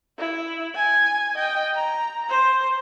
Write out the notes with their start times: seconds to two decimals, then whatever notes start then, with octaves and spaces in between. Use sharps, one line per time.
0.19 E4
0.76 G#5
1.35 D#5 G5
1.75 A#5
2.29 C5